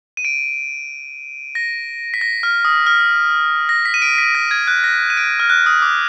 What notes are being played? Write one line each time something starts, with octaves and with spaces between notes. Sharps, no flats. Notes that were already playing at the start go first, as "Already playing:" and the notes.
D#7
D7
A#6
B6
A#6
F6
D#6
F6
A#6
B6
D#7
D7
B6
A#6
G#6
F#6
A#6
D#7
D7
F6
F#6
D#6
D6